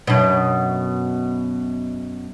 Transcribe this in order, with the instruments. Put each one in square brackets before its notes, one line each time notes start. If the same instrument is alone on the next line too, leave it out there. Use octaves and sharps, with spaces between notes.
[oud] F#2 B2